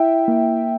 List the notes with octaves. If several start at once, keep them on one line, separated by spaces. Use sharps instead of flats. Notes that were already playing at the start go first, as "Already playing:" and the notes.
Already playing: E4 E5 G5
A#3